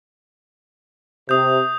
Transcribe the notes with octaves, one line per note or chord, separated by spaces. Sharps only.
C3 D#6 G6